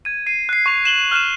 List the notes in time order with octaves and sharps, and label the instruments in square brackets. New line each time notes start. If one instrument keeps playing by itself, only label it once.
[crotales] G#6 D#7
C7 D#7
F#6 C7
C#6 C7 F7
E7 F#7 G7
F6 F#6 D#7 E7